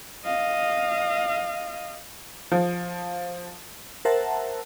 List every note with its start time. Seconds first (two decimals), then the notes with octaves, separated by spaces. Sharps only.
0.25 D#5 F5
2.51 F3
4.05 A#4 C5 E5 F#5 A5